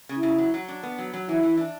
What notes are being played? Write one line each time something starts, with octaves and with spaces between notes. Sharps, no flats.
C#3
E4
C#3
F#3
F#3
D4
B3
F#3
F#3
E3 E4
E3
D4